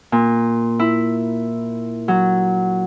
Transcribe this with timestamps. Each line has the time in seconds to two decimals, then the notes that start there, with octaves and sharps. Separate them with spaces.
0.12 A#2
0.79 E4
2.08 F#3